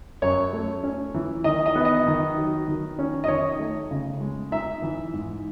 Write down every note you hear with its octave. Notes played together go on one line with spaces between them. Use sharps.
F#2 C#5
A3
C#4
E3
D#3 D#5
D#5
B3
D#5
D#3
F#3
D#3
C#4
D#5
D#3 C#5
A3
C#3
G#3
D#4 E5
E3
G#2